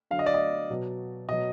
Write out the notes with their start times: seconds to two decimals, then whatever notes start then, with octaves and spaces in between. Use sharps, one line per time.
0.11 D3 F#3 F5
0.19 D#5
0.26 D5
0.34 D#5
0.70 B2 F#3
1.29 B2 F#3 D#5